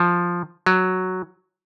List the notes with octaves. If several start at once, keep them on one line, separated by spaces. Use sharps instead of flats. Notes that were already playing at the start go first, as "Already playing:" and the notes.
Already playing: F3
F#3